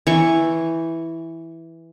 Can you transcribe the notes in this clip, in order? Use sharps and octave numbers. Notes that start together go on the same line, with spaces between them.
E3 G5 C#6